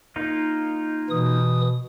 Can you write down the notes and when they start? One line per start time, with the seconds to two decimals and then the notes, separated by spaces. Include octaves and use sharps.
0.16 A#3 D#4 F4
1.10 B2 E3 D#6